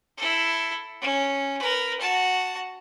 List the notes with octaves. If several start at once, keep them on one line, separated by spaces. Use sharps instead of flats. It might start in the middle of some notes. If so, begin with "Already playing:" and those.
E4 A4
C#4
A#4 B4
F#4 A5